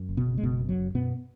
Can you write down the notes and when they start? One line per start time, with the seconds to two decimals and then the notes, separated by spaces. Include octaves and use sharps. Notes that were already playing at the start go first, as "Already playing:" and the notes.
Already playing: F#2
0.09 F#1
0.17 B2 B3
0.26 C#3
0.37 G#3
0.43 F#1 B2 B3
0.60 F#2
0.69 F#3
0.78 F#1
0.94 F#2 B2 B3